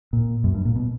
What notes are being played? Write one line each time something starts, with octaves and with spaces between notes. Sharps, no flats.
A#2
F#2
G2
A#2
B2